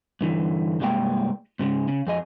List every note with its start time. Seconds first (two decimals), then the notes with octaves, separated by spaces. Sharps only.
0.21 G2 D3 E3
0.80 C2 G2 G3 G#3 A#3 G5
1.59 G#2 C#3 G#3
1.88 C#3
2.07 F2 G#4 D#5